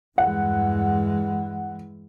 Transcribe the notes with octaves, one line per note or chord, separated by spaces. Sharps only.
E2 G2 E3 G#3 F#5